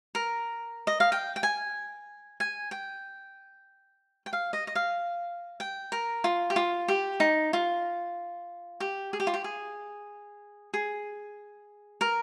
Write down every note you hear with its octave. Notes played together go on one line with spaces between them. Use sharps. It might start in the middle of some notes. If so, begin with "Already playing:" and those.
A#4
D#5
F5
G5
G5
G#5
G#5
G5
G5
F5
D#5
D#5
F5
G5
A#4
F4
G4
F4
G4
D#4
F4
G4
G#4
G4
F4
G4
G#4
G#4
A#4